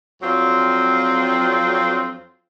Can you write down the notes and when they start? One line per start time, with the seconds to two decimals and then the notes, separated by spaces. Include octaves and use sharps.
0.22 F2 F#3 C4 D4 F4